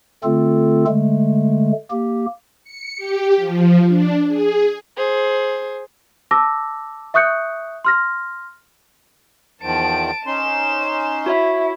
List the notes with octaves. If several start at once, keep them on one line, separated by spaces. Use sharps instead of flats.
D3 A3 C4 F4 A4
D3 G#3 A3
A#3 G4
C#7
G4
F3
D4
G#4
G#4 C5
A5 D6 E6 A#6
E5 C#6 D#6 F#6 G6 C#7
C6 F6 A#6
E2 D#3 F3 A5 D7
C#4 D#4 C6 E7
E4 F#4 C#5 E5